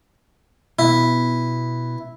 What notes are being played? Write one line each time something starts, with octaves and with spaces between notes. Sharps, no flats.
B2 B3 E4